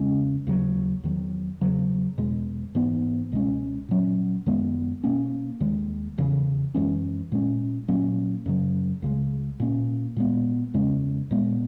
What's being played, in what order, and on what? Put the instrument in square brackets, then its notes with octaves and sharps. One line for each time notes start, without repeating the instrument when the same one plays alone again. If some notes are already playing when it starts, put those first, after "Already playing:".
Already playing: [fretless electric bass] E2 C#3 G#3 C#4
D#2 C#3 F#3
E2 D#3 F#3
E2 C#3 F#3
E2 B2 G#3
G#2 E3 B3
C#2 B2 G#3 C#4
A#2 F#3 C#4
F#2 D#3 G#3 B3
B2 A#3 C#4
D#2 D#3 G#3
E2 C#3 E3
F#2 E3 G#3 C#4
A#2 G#3 C#4
A#2 F#3 A#3 C#4
F#2 C#3 F#3
C#2 C#3 G#3
A#2 A#3 C#4
A#2 G#3 B3
E2 C#3 G#3 C#4
A#2 G#3 B3